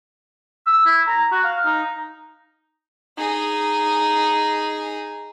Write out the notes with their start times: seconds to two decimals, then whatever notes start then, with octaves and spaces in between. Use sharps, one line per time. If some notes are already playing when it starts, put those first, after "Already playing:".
0.67 E6
0.86 E4
1.07 A#5
1.32 F#4
1.44 F5
1.66 D#4
3.18 D#4 G#4